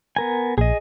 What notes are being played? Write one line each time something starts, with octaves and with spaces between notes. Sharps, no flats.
B3 A#4 G#5
A#1 G#4 D#5